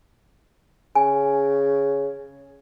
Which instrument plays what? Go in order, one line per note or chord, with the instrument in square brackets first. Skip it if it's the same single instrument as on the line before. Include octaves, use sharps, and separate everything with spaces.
[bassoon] C#3 [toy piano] G#5